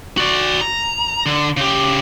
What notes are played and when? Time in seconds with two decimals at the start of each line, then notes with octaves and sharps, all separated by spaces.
0.18 F#4 D5
0.61 A#5
1.26 D3
1.57 C#3 G4